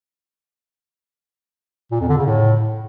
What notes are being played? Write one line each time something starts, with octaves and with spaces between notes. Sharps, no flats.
A#2
F2
D3
C#3
A2